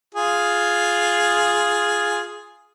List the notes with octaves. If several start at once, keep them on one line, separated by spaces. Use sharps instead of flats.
F4 G#4